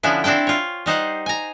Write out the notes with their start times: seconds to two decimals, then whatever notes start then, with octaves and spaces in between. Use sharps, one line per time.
0.03 D3 F3 B3 C#4 D4 E4
0.24 C4 D4 E4 D5 G5
0.47 F4 C#5
0.86 G3 D#4 C5 F#5
1.26 G#5 A#5